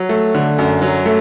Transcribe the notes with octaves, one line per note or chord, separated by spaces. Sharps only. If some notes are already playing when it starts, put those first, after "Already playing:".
Already playing: F#3
A3
D3
F#2
F#3
A3